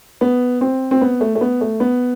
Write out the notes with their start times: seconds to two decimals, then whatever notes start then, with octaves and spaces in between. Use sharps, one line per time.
0.21 B3
0.61 C4
0.91 C4
1.01 B3
1.21 A3
1.35 A3
1.41 B3
1.61 A3
1.80 B3